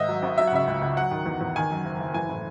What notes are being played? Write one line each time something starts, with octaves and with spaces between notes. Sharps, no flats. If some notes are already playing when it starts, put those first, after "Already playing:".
Already playing: G#2 D#3 D#5 E5
F#3
G#1
F#3 E5
F#5
C#3 E5
C#2
C#2
F#3 F#5
D#3
E2
E2
D#3 G#5
F#2
F#1
F#1
E3 G#5
A2